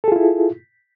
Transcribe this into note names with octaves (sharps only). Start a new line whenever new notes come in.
E4 F4 G#4 A4